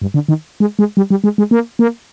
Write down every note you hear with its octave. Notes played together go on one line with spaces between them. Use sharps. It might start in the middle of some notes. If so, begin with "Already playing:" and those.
G2
D3
D#3
G#3
G#3
G3
G3
G#3
G#3
A#3
A#3